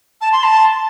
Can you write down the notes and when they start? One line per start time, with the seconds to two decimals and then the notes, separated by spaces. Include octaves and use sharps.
0.21 A5
0.32 C6
0.44 A5